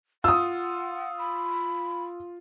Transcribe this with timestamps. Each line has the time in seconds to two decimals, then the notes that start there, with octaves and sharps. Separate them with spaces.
0.24 F4 F#5 D#6 E6
1.19 B5